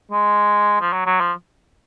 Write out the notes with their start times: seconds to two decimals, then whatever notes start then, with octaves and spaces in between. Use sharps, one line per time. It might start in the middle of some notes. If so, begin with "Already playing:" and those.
0.11 G#3
0.81 F3
0.93 F#3
1.06 F#3
1.21 F3